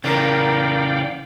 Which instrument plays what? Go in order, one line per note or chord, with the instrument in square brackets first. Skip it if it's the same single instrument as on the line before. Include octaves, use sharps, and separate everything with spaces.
[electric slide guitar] C#3 E3 [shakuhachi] A#4 [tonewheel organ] D5 F5 G5